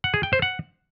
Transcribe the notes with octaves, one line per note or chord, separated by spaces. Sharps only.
F#5
G#4
G5
C5
F#5